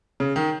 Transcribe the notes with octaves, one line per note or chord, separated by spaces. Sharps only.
C#3
D#3